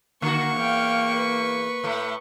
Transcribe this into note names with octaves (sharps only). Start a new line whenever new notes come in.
D3 A#3 F#4 C#6
E2 F5 G5
B4
A2 A3